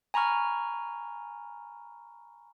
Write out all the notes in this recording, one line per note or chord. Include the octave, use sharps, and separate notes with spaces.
G#5 A#5 B5 C#6 F6